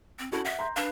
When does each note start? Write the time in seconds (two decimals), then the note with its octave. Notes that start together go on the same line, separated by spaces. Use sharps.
0.19 C4
0.32 C#4 E4 F#4 A4
0.45 E5 F#5
0.59 A#5 C6 G6
0.76 D4 B4 F5